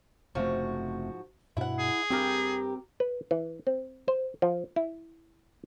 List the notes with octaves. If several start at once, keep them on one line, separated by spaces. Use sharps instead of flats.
F#1 G#2 C3 F3 A3 F#4
G2 B2 E4 F#5
G#4
G2 C4 G4 A#4
B4
E3
C4
C5
F3
E4